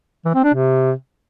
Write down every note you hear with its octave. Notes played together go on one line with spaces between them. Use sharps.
E3
C4
D4
C3